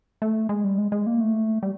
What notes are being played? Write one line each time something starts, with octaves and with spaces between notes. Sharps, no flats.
A3
G#3
G3
G#3
G#3
A#3
A3
G3